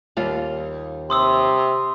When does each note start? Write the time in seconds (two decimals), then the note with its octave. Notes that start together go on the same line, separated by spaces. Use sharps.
0.17 D#2 G3 F4
1.10 C3 C6 D#6 E6